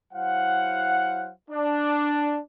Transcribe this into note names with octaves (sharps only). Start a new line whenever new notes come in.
F#3 E4 C5 F5 F#5
D4